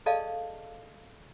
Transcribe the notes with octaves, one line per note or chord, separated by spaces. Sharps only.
G#4 A4 D5 D#5 F5 A5